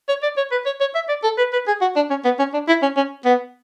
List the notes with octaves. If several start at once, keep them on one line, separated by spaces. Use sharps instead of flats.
C#5
D5
C#5
B4
C#5
C#5
E5
D5
A4
B4
B4
G#4
F#4
D4
C#4
B3
C#4
D4
E4
C#4
C#4
B3